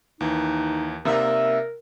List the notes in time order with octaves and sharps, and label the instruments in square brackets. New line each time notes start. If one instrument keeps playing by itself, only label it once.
[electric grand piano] D#2 E3 [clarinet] D#4
[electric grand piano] C3 D5 [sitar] A#3 D#4 E5 [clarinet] A#4